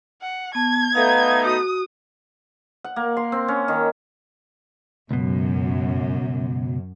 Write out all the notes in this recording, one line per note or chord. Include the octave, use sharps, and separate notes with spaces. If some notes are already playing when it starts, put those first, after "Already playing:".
F#5
B3 A5 G#6
A3 B3 D#4 F5 A#5
F#4 D#6
F#5
A#3
C6
C4
C#4
D#3
C#2 F#2 B2